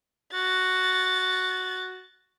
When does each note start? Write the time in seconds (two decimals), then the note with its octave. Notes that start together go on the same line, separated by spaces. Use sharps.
0.33 F#4 A6